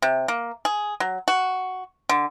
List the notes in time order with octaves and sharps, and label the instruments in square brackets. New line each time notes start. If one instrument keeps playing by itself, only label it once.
[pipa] C3
A#3
G#4
F#3
F#4
D3